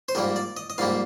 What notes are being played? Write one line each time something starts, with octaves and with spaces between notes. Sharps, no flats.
C5
A#1 G#2 G3 A#3 A#4
D5
D#5
D#5
A#1 G#2 G3 A#3 F5